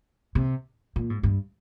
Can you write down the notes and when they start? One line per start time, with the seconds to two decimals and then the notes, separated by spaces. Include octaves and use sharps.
0.35 C3
0.96 A#2
1.10 G#2
1.23 G2